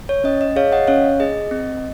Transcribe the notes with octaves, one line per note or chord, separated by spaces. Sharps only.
C#5
C#4 D#5
D#5
G#4 C#5 F5
D#5 F#5
C#4 C#5 F5
G#4 D#5
C4